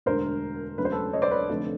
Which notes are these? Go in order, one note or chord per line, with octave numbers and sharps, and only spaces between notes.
E1 D2 D3 A#4 C5
E1 D2 C#3 F#3 B4
C5
A4 B4
C#5 D#5
C5 D5
B4 C#5
F1 F2 D3